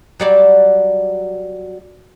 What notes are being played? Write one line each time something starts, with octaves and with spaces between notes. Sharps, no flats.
F#3 G3 D5